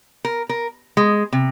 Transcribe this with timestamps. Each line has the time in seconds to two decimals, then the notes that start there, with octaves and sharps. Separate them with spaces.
0.25 A#4
0.49 A#4
0.97 G#3
1.33 C3